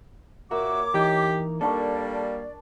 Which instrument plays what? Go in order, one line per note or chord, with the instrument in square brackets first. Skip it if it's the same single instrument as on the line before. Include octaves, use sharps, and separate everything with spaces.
[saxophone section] A#2 F#4 E5 [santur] A#3 [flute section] C#5 D6
[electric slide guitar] E3 [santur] D#4 [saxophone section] G4
[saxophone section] G3 A#3 [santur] D4 A5 C#6 [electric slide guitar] A4 [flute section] D5